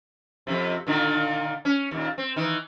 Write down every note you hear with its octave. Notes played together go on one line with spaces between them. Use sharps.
F2 A2 C3
A#2 D3 D#3
C#4
D#2 A#2
C4
D#3 E3